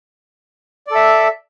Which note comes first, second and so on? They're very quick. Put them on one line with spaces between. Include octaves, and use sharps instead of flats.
D5 A4 E5